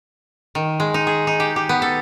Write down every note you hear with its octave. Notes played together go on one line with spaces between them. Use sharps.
D#3
G#3
D#4
G#4
D#4
G4
G4
B3
A4